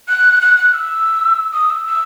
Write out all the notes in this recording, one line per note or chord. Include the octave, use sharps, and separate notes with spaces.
F#6
F#6
F#6
E6
D#6
E6
E6